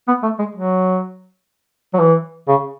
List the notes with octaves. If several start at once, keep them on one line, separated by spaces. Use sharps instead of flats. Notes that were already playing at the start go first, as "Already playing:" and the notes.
B3
A3
G#3
F#3
F#3
E3
C#3